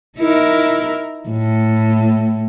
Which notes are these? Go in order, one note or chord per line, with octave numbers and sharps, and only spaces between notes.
D#4 E4 A#4
A2